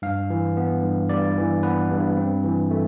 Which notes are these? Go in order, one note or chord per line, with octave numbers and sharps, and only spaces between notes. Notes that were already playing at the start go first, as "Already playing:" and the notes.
G2 F5
E3
B3
G2
G2 D5
E3
B3 B4
G2
C4
E3
A3